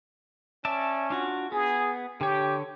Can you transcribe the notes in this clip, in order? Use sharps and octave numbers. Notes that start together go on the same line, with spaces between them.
C#4 D5 E5 A5
D4 F4 F#4
B3 G#4
D3 G4 C#5